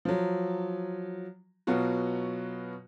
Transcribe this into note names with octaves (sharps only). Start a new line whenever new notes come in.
F3 F#3
B2 F#3 B3 F4 F#4